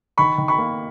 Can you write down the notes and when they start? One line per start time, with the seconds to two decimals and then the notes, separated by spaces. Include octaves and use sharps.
0.18 D#3 B5 C#6
0.38 D#3
0.48 B5 C#6
0.58 A#3